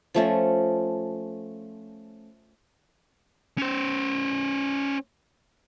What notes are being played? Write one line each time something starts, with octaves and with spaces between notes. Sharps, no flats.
F3 A3 C#4
C#4 C5